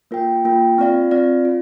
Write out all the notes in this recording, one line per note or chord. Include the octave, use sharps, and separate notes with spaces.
A#3 F4 A#4 G5
A#3 F4 A#4 G5
C4 F4 D5 F5
C4 F4 D5 F5
F4